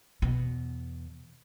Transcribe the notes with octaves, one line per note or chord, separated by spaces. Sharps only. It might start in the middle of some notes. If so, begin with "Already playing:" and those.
E2 B2